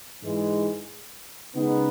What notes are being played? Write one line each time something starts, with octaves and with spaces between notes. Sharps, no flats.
G#2 E3 G#3
C#3 G#3 B3 D#4